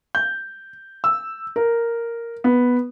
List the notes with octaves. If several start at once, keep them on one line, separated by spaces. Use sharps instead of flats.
G6
E6
A#4
B3